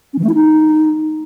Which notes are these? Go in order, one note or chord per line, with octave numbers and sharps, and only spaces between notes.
C#4
E3
A3
E4
D#4